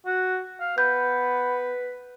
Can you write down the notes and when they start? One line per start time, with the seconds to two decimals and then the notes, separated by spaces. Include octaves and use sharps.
0.06 F#4
0.60 F5
0.78 B3 B4 G6